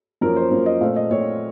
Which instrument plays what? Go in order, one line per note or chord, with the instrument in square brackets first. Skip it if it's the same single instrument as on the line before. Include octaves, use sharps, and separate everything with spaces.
[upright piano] F#2 F3 A#3 C#4 A#4
C5
F#2 F3 A#3 C#4
D#5
A#2 A3 C4 F5
D#5
A#2 A3 C4 C#5